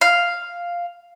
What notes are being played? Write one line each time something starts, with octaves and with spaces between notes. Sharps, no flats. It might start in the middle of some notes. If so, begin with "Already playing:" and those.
F5